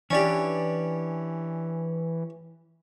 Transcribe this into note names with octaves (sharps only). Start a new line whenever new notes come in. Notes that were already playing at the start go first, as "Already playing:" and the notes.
E3 C#4 D4 G4 D5